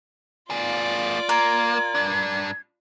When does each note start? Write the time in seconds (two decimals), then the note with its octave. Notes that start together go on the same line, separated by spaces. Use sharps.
0.50 A#3 F4 G#4 D5 F5
1.29 A#3 A#4 G#6
1.95 G2 D4